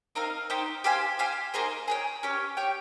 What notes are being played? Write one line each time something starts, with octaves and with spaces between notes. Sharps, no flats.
C4 D#4 A#4 F5
D#4 G4 C5
G4 C5 F5 G#5
G4 C5 F5 G#5
A#3 D#4 G#4 C5
G#4 C#5 G5
C#4 G4 C#5
G4 C#5 G5